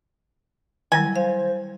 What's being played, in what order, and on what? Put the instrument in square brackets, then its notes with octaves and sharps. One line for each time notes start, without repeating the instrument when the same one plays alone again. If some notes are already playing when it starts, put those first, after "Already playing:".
[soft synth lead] D#3 [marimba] F#3 G3 E4 [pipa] G#5
[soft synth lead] C5 [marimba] F5